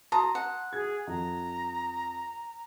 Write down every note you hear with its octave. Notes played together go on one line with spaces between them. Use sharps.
A5 A#5 C6 D#6
F#5
G#4 G#6
F2 A#5